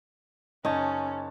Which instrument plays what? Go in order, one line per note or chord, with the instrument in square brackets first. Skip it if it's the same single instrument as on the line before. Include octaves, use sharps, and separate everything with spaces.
[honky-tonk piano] F#1 C#5 A5 [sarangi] C#4 [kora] D#4